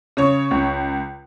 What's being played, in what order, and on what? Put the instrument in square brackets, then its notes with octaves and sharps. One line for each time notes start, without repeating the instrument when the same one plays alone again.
[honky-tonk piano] C#3 C#5
C#2